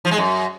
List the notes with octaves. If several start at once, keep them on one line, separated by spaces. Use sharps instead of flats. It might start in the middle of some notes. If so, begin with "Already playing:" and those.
F3
G#3
F#2